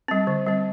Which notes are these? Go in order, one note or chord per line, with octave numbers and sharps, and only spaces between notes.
G3 C4
D3
G3 C4